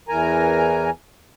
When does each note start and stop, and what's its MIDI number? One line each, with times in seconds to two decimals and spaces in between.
0.08 0.90 40
0.08 0.90 52
0.08 0.90 70
0.08 0.90 80
0.08 0.90 82